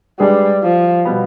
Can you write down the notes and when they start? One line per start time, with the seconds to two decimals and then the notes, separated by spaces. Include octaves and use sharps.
0.19 G3 G#3 D4 G#4 B4
0.62 F3
1.05 B2 G3 B3